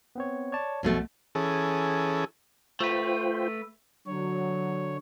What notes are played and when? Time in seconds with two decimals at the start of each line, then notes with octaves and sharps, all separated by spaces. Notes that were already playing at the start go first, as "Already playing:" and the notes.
0.16 B3 C4 C#5
0.52 C#5 D5 A5
0.83 B1 F2 B2 A3 A6
1.35 E3 C#4 G#4 A4
2.80 A3 F4 B4 C5 G5
4.07 D3 F#3 C#5